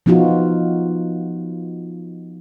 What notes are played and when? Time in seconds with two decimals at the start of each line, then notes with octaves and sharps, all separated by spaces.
0.06 F3 B3 D#4 F4 F#4